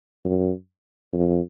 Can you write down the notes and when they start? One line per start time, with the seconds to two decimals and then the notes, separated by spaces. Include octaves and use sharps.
0.25 F#2
1.13 F2